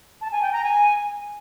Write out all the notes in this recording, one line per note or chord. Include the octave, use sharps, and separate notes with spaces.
A5
G#5
G5
A#5
G#5